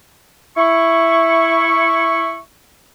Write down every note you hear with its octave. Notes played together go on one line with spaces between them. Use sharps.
E4 C#6